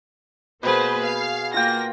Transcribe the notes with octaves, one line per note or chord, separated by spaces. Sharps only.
B2 A#3 G#4 B4 C5
F5
A#3 F4 G5 A#6